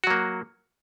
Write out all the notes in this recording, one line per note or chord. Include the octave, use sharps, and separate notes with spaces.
F#3 A#3 F#4